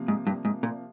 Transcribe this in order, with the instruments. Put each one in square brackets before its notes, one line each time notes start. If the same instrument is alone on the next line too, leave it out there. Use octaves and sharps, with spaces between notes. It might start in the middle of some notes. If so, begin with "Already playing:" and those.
Already playing: [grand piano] C3 F3 A#3
[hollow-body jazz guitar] G#2
G2
G#2
A#2